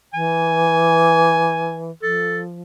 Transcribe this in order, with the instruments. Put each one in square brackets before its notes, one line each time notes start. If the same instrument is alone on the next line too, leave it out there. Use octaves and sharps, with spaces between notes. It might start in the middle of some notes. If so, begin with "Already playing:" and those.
[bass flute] E3 [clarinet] G#5
[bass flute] F3 [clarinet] A4